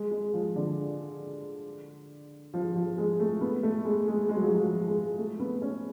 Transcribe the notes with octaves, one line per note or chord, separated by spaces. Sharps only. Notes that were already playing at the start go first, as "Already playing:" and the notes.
Already playing: G#3
G#3
F3
D3
F3
F3
G#3
A3
B3
A3
G#3
G#3
G#3
F#3
F3
F#3
F3
G#3
A3
B3
C#4